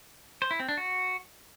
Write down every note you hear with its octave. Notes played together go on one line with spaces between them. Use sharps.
C5
E4
C4
D4
F#4